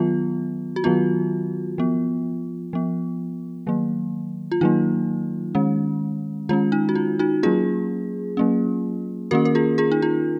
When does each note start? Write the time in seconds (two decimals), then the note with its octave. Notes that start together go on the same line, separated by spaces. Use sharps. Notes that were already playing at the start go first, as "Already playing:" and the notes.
Already playing: D#3 F#3 B3 F4
0.76 F#4
0.84 D#3 F#3 B3 F4
1.78 F3 B3
2.73 F3 B3
3.67 D#3 F#3 A#3
4.52 F4
4.61 D#3 F#3 A#3 D#4
5.55 D#3 G#3 C#4
6.49 D#3 G#3 C#4 F4
6.72 D#4
6.89 F#4
6.95 F4
7.19 D#4 F#4
7.43 F#3 A#3 C#4 F4 G#4
8.37 F#3 A#3 C#4
9.31 D#3 A#3 C#4 F#4 A#4
9.45 A#4
9.55 F4 G#4
9.78 F4 G#4
9.92 D#4
10.02 F4